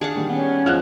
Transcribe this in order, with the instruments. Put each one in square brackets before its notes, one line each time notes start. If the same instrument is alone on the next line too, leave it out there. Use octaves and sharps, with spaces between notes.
[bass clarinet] D4 [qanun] G#4 F5 F#5
[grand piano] D#3 G3
[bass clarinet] B3 [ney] C#4
[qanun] F3 G#3 [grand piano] F6 F#6